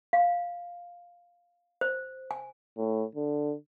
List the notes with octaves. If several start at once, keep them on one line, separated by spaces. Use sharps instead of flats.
F5
C5
G#5
A2
D3